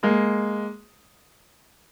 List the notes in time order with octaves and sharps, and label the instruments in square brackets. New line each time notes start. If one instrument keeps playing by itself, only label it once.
[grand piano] G#3 A#3